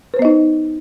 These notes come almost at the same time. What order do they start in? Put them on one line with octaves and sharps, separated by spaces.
B4 C5 B3 D#5 D#4